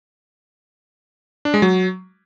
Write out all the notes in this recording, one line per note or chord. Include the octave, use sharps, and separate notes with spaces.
D4
G#3
F#3